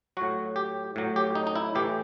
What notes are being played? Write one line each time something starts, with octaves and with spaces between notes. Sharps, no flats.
A2 F#3 F#4
G4
A2 F#3
G4
D#4
D#4
E4
A2 E3 G4